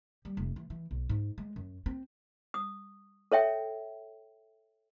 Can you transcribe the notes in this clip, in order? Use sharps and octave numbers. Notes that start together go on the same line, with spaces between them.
G3
F1
E3
E3
B1
G#2
G#3
F#2
C4
D#6
A4 C#5 E5 G5